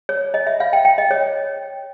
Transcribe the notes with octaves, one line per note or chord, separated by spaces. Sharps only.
C#5
D#5
E5
F5
G5
G5
D#5
C#5